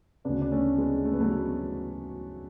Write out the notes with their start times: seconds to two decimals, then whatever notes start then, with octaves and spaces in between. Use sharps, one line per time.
0.25 D2 C#3 B3 D4
0.42 D4
0.51 A3 C#4
0.78 G#3 B3
1.05 A3
1.12 B3
1.20 F#3 A3
1.32 F#3